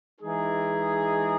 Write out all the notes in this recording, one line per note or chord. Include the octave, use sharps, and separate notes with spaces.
E3 G#3 D#4 G#4